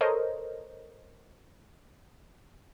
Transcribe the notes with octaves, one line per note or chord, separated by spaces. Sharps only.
A4 A#4 C5 C#5 D#5